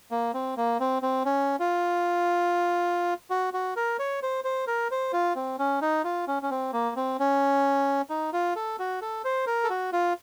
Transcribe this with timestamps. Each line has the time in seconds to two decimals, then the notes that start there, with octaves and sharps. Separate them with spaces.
0.11 A#3
0.34 C4
0.57 A#3
0.80 C4
1.03 C4
1.25 C#4
1.60 F4
3.30 F#4
3.54 F#4
3.76 A#4
3.99 C#5
4.23 C5
4.44 C5
4.67 A#4
4.91 C5
5.13 F4
5.36 C4
5.59 C#4
5.82 D#4
6.04 F4
6.28 C#4
6.43 C#4
6.51 C4
6.73 A#3
6.96 C4
7.19 C#4
8.10 D#4
8.33 F4
8.56 A4
8.79 F#4
9.02 A4
9.25 C5
9.47 A#4
9.64 A4
9.70 F#4
9.93 F4